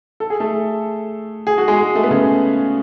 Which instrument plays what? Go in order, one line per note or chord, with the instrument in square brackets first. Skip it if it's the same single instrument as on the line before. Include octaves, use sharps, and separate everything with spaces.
[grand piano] A4
G#4
A3 A4
G#4
F#4
G#3 G#4
A3
B3
C#3 C#4